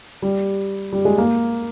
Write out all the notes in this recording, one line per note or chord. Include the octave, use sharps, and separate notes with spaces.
G3
G3
G#3
A#3